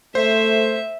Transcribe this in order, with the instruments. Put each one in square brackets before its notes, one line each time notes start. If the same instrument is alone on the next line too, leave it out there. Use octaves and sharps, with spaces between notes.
[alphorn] A3 [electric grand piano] C5 [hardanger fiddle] E5